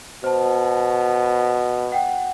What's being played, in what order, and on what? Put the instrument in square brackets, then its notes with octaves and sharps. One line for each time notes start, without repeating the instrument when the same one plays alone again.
[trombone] B2 [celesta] C5 A5
[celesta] F#5 G5